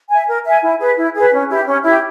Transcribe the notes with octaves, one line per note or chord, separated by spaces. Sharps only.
E5 G#5
A#4
E5 G#5
E4
G#4 B4
E4
G#4 B4
C#4
E4 G4
C#4
E4 G4